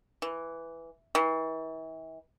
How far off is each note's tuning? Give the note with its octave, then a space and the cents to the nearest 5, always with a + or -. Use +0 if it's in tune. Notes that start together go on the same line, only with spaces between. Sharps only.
E3 +5
E3 -40